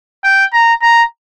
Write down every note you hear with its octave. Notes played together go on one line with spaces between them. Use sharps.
G5
A#5
A#5